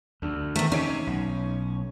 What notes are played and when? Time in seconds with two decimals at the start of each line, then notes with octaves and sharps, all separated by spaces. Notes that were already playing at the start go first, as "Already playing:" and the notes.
0.22 D2 D3
0.56 E2 D#3 A3
0.72 C3 C#4 D#4 C#5 D7
1.07 B1